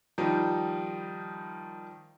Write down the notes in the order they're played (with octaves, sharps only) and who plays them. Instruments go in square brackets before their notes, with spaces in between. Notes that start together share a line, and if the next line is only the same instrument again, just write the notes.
[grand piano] D#3 F3 G3 D#4